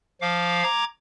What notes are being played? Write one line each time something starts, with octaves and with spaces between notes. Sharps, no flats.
F3 F5 D6
A#5 D6 G#6